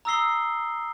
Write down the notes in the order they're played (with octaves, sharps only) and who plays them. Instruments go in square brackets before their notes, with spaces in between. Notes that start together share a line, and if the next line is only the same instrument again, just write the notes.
[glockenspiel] A#5 D#6 E6 A#6 C7 G7